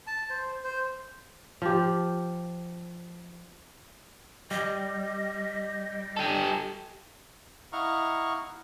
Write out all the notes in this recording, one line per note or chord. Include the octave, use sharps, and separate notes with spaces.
A5
C5
C5
F3 G4
G3 D#5
G4 A4
E4 D#5 F5 F#5 A#5 C#6